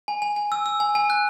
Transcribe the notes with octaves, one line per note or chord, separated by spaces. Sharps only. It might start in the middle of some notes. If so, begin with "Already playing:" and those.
G#5
G#5
G#5
E6
E6
G#5
G#5
F#6